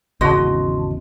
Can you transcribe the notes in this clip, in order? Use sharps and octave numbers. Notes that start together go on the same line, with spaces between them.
G#1 E2 C#3 F#4 D#5 A5 C6